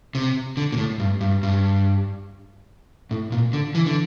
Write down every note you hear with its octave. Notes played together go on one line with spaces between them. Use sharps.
C3
D3
A#2
A2
G2
G2
G2
A2
A#2
D3
E3
D3